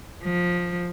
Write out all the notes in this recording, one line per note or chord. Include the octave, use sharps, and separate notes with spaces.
F3